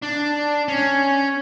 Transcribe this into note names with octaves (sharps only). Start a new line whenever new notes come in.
D4
C#4